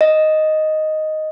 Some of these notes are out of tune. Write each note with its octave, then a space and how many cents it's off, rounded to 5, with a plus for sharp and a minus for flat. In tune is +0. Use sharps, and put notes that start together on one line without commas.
D#5 +0